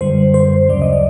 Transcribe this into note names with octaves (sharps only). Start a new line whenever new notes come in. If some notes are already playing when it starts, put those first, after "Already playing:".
F#2 D3 G3 C5
C5
D2 C#3 F#3 D5
D#5
D5